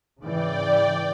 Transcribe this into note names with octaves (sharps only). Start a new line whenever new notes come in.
G#2 C#3 E3 D5 G5